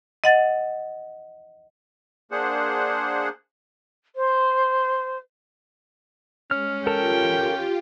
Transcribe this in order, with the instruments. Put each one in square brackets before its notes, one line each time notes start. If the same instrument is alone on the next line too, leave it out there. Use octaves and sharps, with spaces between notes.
[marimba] D#5 F#5 A6
[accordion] A#3 D4 G#4 C5 F#5
[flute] C5
[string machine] G#3 [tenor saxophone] C#4 [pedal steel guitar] F6
[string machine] F4 G4 [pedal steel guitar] A4 A#4 A5 [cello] G5